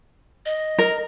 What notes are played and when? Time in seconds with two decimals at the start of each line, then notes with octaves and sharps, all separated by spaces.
0.46 D#5
0.78 A#4